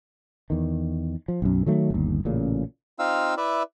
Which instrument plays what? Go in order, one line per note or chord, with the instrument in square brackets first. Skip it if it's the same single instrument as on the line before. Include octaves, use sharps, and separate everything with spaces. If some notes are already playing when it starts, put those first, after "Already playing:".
[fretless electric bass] E2 D#3
F3
B1 F#2
D#3 F#3 A3
G1 D#2
A1 A#2 C#3
[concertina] C4 D#4 F4 F5 E6
E4 B4 D5 E5